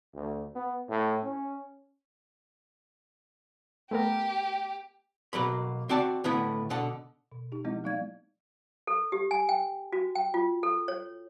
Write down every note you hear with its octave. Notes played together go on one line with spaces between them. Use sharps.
D2
B3
A2
C#4
A3 B3 G4 A#4
B2 F#3 A#3 B5
C4 F#4 D5 A5
A2 D3 B3 E4
B2 D3 F#5 A5
B2
D#4 G4
F3 G#3 B3 C4 E4 D#5
F#3 A#3 D#4 D5 F5 G#6
A4
G4
G#5
G5
F#4
G5
F4
A4
C#5